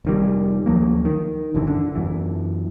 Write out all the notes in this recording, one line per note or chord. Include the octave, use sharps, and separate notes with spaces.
F1 D#3 G3
D2 F3 F#3 A#3
D#3
F#1 F#2 D3 E3
D3
F#2 E3